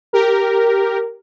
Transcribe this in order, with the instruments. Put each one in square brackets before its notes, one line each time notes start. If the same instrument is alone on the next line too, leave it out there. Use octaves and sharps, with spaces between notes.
[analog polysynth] G4 A#4